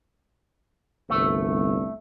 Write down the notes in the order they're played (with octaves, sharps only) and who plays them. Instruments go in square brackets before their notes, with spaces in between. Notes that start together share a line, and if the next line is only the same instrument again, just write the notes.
[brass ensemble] G1 C2 [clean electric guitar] A3